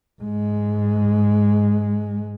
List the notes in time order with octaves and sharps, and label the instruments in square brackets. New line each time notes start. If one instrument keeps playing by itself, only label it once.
[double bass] G#2 G#3